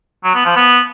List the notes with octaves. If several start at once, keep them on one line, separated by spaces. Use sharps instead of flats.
F#3
B3
F3
B3